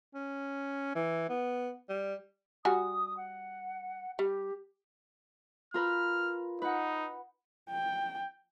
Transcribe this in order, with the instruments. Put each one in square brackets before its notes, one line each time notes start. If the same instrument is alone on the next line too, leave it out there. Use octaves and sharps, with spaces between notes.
[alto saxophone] C#4
E3
B3
G3
[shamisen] G3 F#4 G#5 [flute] D#6
[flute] F#5
[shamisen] G3 [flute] G4
[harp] F4 A#4 B4 [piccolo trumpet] F6
[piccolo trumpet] D#4 [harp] B4 F#5
[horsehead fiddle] G5